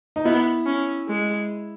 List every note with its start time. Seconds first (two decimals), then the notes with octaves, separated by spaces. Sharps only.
0.16 D#4
0.25 B3 E4
0.66 C#4
1.08 G#3